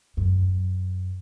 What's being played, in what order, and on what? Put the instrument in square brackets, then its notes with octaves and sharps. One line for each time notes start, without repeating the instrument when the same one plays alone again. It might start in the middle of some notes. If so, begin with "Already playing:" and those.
[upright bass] F#2